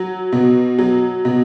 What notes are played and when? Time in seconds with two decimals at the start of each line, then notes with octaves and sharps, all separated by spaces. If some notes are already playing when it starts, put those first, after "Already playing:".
Already playing: F#3
0.33 B2
0.79 F#3
1.25 B2